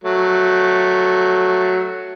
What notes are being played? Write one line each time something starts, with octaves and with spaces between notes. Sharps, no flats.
F#3 A3